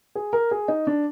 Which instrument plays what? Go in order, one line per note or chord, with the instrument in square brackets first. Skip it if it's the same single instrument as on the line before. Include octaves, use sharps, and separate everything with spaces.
[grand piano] G#4
A#4
G#4
D#4
D4